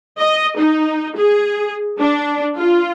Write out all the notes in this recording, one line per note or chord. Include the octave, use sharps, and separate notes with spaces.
D#5
D#4
G#4
D4
F4